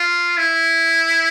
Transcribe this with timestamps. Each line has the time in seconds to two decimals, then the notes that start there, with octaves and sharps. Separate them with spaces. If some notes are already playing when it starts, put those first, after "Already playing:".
Already playing: F4
0.37 E4